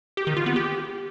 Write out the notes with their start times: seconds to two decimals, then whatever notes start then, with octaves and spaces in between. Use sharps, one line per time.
0.17 G4
0.27 D#3
0.37 F4
0.46 B3
0.56 G4